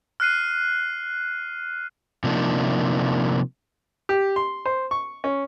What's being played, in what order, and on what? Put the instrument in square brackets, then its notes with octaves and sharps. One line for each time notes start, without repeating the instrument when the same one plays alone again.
[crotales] F6 F#6 C7 D#7
[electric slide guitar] C3 F3 A#3 D4 D#4
[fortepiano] G4
C6
C5
C#6
C#4